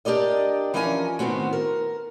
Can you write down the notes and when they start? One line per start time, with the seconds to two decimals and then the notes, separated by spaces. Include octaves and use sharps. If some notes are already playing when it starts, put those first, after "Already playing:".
0.05 D4 G4 A#4 D5 D#5
0.74 E3 F3 C#4 A#4 D5 G#5
1.19 A2 D#3 B3 C4 F#4
1.53 A#4